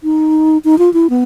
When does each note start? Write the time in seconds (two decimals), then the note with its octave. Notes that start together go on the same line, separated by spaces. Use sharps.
0.04 D#4
0.65 D#4
0.78 F4
0.94 E4
1.10 B3